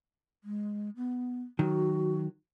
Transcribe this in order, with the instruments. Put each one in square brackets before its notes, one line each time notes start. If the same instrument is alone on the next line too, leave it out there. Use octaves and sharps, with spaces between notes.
[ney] G#3
B3
[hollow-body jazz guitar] D#3 F#3 [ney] F#4